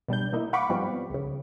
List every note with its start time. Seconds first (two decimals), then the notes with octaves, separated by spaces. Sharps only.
0.08 B2 G3 D4 G6
0.32 E3 A#3 D#4 E4
0.53 F5 F#5 B5 C#6 D6
0.69 G#2 F3 G3 B3 C4
1.10 C#2 C#3